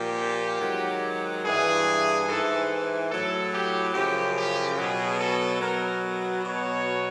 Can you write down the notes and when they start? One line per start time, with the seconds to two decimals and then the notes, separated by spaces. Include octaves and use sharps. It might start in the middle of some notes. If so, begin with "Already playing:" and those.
Already playing: A#2 F3 G4
0.61 G#2 D#3 F#3
1.44 G2 E3 G#4
2.28 G#2 E3 A4
3.10 A2 F#3 A4
3.53 G4
3.94 F#2 C#3 F3 G4
4.36 G4
4.77 B2 F#3 G#4
5.20 A4
5.61 B2 F#3 A#4
6.45 B2 F#3 C#5